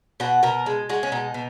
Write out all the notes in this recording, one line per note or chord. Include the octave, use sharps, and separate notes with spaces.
B2 F#4
B2 A#4
G#3
G#3 F#4
C#4
B2 D#4
B2